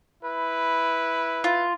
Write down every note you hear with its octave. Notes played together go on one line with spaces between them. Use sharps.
E4 B4
F4